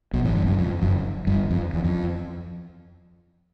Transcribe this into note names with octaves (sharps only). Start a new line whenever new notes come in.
B1 B2
A1 A2
G1 G2
F#1 F#2
F2
F#1 F#2
G1 G2
F2
E2
F2